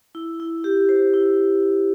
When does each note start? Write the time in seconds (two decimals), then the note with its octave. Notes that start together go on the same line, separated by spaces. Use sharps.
0.15 E4
0.40 E4
0.64 G4
0.89 C5
1.14 E4